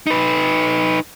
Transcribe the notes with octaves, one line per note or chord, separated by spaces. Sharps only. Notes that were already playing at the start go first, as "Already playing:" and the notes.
D#4 B4